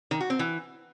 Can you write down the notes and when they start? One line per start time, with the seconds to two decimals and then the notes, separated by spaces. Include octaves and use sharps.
0.11 D#3
0.20 F#4
0.30 C4
0.39 E3